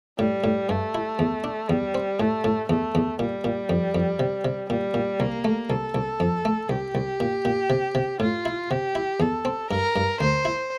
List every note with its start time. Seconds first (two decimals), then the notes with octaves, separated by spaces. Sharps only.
0.18 A2 G3
0.44 A2
0.69 G2 A3
0.95 E4
1.19 E2
1.44 D4
1.69 E2 G3
1.95 C4
2.20 A2 A3
2.44 A2
2.69 E2 A3
2.95 E2
3.19 A#2 G3
3.44 A#2
3.70 F2
3.95 F2
4.19 C3
4.45 C3
4.69 A#2 G3
4.94 A#2
5.20 C2 A#3
5.45 A3
5.70 C2 A4
5.95 C2
6.20 F2
6.45 A3
6.69 C2 G4
6.95 C2
7.20 A#2
7.45 A#2
7.70 C3
7.95 C3
8.20 A2 F4
8.46 E4
8.70 C3 G4
8.95 E4
9.20 E2 A4
9.45 C4
9.70 G2 A#4
9.96 G2
10.20 D2 C5
10.45 E4